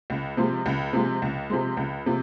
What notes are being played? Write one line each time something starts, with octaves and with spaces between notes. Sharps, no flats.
C#2
C3 F3 G#3
C#2
C3 F3 G#3
C#2
C3 F3 G#3
C#2
C3 F3